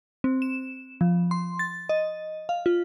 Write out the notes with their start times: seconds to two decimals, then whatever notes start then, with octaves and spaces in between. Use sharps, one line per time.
0.24 C4
0.42 E7
1.01 F3
1.31 C6
1.59 A6
1.89 D#5
2.49 F5
2.66 F4